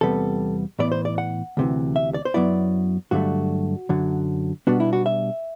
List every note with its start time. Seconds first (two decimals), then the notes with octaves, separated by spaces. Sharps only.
0.01 E2 C3 G3 B3 A4
0.79 A2 E3 B3 D5
0.92 C5
1.05 D5
1.18 F#5
1.57 D2 C3 E3
1.96 E5
2.14 D5
2.25 C5
2.34 F#2 F#3 B3 E4 D5
3.11 G2 D3 F#3 A3 F#4
3.89 F#2 D3 F#3
4.67 B2 G3 B3 D4 F#4
4.80 E4
4.93 F#4
5.06 E5